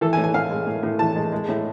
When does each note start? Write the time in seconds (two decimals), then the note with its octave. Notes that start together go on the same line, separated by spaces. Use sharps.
0.01 E3 A4
0.13 G#5
0.18 A2
0.24 G#5
0.34 A2 F5
0.50 G#3
0.67 A2
0.83 A2
0.99 E3 A5
1.16 G#3
1.32 G#3
1.49 A2